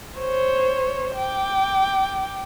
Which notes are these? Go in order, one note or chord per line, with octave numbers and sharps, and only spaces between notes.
C5 C#5
G5 D6